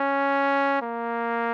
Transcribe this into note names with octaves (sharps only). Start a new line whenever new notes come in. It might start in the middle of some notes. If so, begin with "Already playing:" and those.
Already playing: C#4
A#3